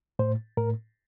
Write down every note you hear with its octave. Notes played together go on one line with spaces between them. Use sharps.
A2 C5
A2 A#4